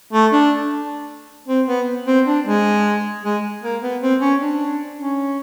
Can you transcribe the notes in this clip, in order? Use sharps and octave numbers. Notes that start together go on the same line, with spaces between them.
A3
D4
C4
B3
C4
D4
G#3
G#3
A#3
B3
C4
C#4
D4
C#4